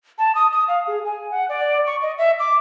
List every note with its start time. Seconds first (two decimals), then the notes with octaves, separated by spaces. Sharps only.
0.18 A5
0.35 D#6
0.53 D#6
0.68 F5
0.87 G#4
1.05 G#5
1.31 F#5
1.49 D5
1.87 C#6
2.02 D#5
2.18 E5
2.40 D6